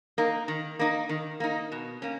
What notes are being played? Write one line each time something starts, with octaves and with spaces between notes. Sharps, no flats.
A#3 D#4
D#3
A#3 D#4
D#3
A#3 D#4
B2
A#3 C#4